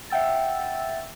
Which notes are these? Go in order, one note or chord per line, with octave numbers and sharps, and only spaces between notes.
E5 F#5 G5 E6 A6